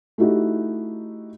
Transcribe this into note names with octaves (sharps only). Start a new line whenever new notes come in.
A3 D#4 E4 F#4 G4